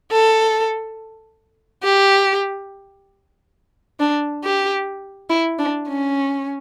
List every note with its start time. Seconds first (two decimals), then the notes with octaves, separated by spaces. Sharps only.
0.11 A4
1.84 G4
4.00 D4
4.43 G4
5.29 E4
5.59 D4
5.87 C#4